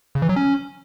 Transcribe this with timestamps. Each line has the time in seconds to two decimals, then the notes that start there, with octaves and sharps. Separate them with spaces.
0.15 C#3
0.22 E3
0.29 F#3
0.36 C#4